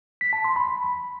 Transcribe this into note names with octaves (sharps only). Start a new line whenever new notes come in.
B6
A5
C6
B5